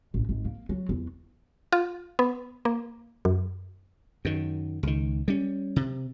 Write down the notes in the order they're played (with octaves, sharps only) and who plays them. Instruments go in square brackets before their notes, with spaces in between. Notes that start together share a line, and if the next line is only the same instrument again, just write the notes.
[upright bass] A1
G#1
A#3
F#3
E2
[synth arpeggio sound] F4
B3
A#3
F#2
[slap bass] F#2 D#3
C#2 D#3
G3 C#4
C3